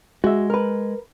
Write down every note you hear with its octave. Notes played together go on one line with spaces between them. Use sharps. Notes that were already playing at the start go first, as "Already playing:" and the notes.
G#3 F#4 E5
A#4 B4